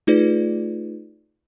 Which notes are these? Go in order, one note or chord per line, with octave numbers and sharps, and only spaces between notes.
A3 D#4 F4 G#4 B4 D5